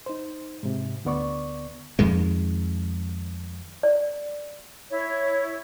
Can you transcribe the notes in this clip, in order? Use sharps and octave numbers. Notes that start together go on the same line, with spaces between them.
D#4 C5
G#2 C3
D2 D3 B3 D5 C#6
F2 D#3 G#3
D5
E4 C#5